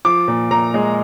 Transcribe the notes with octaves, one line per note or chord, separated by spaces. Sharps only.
F3 D6
A#2
A#2 A#5
G#3